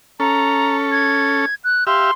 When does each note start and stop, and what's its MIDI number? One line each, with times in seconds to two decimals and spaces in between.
0.20 1.46 61
0.20 1.46 69
0.20 0.76 82
0.92 1.55 92
1.64 1.84 90
1.87 2.11 67
1.87 2.11 76
1.87 2.11 77
1.87 2.13 84